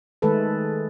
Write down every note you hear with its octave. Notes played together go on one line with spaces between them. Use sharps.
D#3 G#3 A3 A4 B4